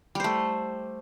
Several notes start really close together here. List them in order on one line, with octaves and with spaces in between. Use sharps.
G3 C5 A3